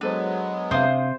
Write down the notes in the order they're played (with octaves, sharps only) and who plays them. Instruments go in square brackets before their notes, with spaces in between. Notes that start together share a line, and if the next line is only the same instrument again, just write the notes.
[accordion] F#3 G#3 B3 [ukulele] D4 A4 C5 [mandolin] B4
[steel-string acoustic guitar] C3 [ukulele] D4 F5 [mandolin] C5 C6 D#6